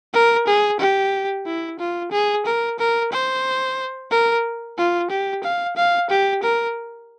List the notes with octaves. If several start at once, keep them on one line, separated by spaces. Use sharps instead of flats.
A#4
G#4
G4
E4
F4
G#4
A#4
A#4
C5
A#4
F4
G4
F5
F5
G4
A#4